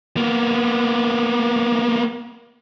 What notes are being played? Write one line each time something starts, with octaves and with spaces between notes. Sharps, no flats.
A#3 B3